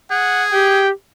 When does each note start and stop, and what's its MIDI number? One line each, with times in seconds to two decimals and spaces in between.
0.11 0.82 68
0.11 0.44 78
0.53 0.91 67
0.53 0.89 79